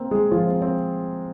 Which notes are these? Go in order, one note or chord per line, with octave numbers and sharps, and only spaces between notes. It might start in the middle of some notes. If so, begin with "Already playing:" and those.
Already playing: A#3 C4
G#3 G#4
F3 F4
C4
C4